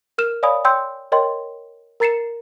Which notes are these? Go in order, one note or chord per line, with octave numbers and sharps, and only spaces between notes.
A#4 F6 E7
C#5 D5 F5 G#5 B5 D#6
C#5 G5 C6 E6 G6
A#4 C#5 D#5 G5 C6
A#4 A#5 A6 C7 C#7 E7